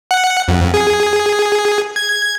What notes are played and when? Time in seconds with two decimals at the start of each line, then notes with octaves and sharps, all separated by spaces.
0.11 F#5
0.48 F2
0.74 G#4
1.96 G#6